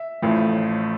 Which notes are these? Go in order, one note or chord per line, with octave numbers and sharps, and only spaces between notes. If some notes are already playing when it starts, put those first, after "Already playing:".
Already playing: E5
A1 A2 F3